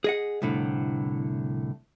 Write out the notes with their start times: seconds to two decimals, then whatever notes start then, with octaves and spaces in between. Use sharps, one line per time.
0.04 G#4 D#5 F#5
0.42 C2 A2 D3